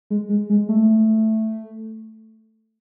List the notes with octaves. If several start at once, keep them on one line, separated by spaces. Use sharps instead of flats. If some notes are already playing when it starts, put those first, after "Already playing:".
G#3
G#3
G#3
A3